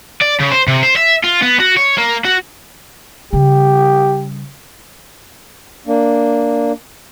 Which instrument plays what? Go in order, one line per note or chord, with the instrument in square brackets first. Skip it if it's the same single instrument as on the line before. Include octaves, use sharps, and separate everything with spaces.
[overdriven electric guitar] D5
C#3
C5
C3
C5
E5
F4
B3
F#4
C#5
A#3
F#4
[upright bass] C#3 G3 [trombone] G4
[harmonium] A#3 D4